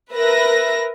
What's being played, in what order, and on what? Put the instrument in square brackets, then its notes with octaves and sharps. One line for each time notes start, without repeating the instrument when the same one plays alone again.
[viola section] A#4 [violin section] B4 E5 A#6